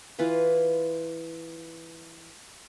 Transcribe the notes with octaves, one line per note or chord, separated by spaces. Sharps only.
E3 F4 B4